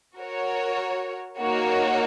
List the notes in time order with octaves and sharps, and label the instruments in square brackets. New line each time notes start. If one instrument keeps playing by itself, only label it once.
[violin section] F#4 A#4 C#5
A#3 D#4 F#4 C#5